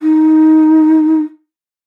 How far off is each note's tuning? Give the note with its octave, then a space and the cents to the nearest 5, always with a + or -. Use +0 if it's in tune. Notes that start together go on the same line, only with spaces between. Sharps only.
D#4 +10